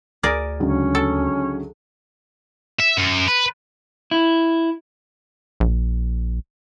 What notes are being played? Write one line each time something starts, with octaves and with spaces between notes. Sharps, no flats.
D2 G#4 A#4 D5
C#2 D3 F#3 C#4
A4
E5
F#2
B4
E4
A#1